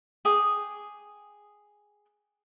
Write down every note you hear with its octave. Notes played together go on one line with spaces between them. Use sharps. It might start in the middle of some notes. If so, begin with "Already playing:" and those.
G#4 G5 D6 D#6